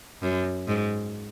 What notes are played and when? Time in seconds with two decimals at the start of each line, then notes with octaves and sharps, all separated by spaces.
0.22 F#2
0.67 G#2